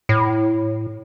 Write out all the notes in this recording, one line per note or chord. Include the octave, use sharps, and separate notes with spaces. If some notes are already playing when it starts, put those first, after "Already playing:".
A2